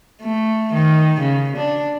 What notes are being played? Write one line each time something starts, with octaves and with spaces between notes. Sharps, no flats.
A3
D#3
C#3
D4